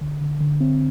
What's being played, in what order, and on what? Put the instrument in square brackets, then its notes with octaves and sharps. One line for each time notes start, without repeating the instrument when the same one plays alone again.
[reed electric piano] D3
D3
D3
C4